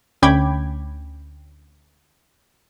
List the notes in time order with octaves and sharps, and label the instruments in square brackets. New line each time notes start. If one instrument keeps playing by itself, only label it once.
[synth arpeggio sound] D2 C#4 G5 B5 D6 G#6